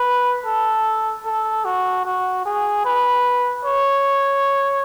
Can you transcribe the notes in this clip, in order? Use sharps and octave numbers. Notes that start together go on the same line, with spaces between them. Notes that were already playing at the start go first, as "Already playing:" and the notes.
Already playing: B4
A4
A4
F#4
F#4
G#4
B4
C#5